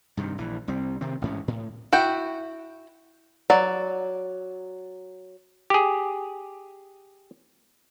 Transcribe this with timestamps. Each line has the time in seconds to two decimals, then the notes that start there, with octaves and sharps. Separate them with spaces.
0.17 G2 C3 D#3
0.38 A#1 E3
0.68 C2 G3 C4
1.01 C3 D#3 C4
1.22 A1 G#2 C#4
1.48 A2
1.93 E4 F#4 G5
3.50 F#3 D5
5.70 G4 G#4